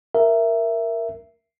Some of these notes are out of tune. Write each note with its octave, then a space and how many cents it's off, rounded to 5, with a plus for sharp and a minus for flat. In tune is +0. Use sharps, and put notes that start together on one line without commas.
A#4 +0 E5 +10